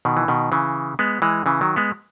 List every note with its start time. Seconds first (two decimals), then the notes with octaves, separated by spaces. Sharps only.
0.05 B2 D#3
0.17 E3
0.28 B2 D#3
0.52 C#3 E3
0.99 G#3 B3
1.22 E3 G#3
1.46 C#3 E3
1.61 D#3 F#3
1.76 G#3 B3